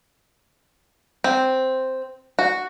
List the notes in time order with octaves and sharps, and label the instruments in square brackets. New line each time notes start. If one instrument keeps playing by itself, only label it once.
[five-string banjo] C4
F#4